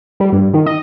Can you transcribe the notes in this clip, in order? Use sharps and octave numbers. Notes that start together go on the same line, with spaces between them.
G3
G2
D#3
D#5